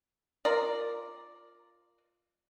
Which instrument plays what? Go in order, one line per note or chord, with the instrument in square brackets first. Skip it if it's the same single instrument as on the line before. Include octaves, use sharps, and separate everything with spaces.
[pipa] F4 A#4 D5